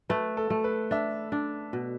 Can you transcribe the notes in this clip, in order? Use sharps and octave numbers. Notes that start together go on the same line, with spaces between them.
A3 B4
A4
A3
B4
D4 E5
D4
B2